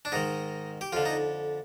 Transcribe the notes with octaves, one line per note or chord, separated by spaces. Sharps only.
D4
G#2 D#3 D#4
G4
F2 D3 F4
D#4